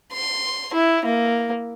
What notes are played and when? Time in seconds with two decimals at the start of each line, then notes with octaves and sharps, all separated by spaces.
0.13 C6
0.74 E4
1.05 A#3